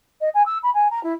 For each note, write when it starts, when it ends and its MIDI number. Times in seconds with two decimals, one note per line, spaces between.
0.21 0.29 75
0.34 0.43 80
0.46 0.58 88
0.63 0.71 83
0.74 0.91 80
0.91 1.02 82
1.04 1.14 64